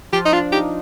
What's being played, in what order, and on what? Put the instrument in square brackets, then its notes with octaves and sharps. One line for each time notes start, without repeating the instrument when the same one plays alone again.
[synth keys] F3 F4 [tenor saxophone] G4
[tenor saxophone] D#4
[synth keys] D4 [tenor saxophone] F4
[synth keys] D#4 [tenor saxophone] G4